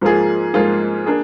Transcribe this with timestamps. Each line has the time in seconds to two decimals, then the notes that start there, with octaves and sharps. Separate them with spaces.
0.01 G#2 F3 A#3 F4 G#4
0.54 G#2 F3 A#3 F4 G#4
1.06 A#3 D4 G#4